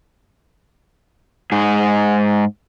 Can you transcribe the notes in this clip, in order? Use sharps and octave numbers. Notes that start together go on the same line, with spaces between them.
G#2 G#4